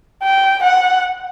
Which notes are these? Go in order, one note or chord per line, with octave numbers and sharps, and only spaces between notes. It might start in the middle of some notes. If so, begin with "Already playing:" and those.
G5
F#5